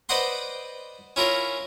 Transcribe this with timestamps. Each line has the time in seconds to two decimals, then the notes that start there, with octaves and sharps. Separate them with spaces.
0.09 B4 C5 D5 D#5 F#5 C6
1.16 C#4 E4 F4 A#4 C#5